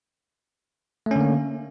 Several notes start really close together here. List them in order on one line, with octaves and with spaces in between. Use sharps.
A3 C#4 D3 A#3